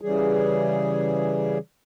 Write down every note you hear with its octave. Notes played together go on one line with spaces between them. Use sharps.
C#3 E3 G3 G#4